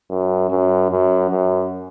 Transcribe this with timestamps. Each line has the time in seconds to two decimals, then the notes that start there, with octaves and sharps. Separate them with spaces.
0.10 F#2
0.50 F#2
0.91 F#2
1.30 F#2